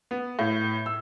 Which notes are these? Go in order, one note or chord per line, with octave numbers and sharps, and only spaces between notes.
B3
A2
E6